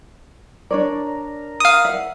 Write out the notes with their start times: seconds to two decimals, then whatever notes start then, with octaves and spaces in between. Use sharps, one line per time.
0.71 D4 A#4 C#5 D5
1.60 F5 D#6
1.85 E5 F#5